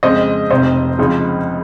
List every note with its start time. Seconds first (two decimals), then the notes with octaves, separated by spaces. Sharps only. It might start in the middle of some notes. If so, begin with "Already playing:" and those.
0.03 F2 C#3 G#3 C5 D#5
0.50 F1 F2 C3 C5 D#5
0.99 C#2 C#3 F3 C4 D#4